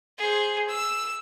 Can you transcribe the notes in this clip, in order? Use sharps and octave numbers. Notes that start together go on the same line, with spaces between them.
G#4 C5
E6